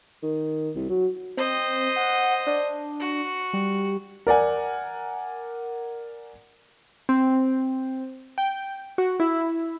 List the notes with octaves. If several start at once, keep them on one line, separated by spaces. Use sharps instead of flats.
D#3
C2
F#3
C4 C5 D#5
F#5
D4
F#4
G3
A#4 D5 F#5 G#5
C4
G5
F#4
E4